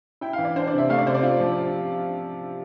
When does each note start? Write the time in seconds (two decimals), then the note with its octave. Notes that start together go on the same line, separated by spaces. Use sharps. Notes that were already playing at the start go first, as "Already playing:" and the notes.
0.21 E4 G5
0.33 F5
0.38 E3
0.45 D5
0.56 D4 C5
0.67 D5
0.73 C3
0.78 E5
0.89 A3 F5
0.98 D5
1.06 C3 C5
1.14 D5
1.23 F4
1.40 F3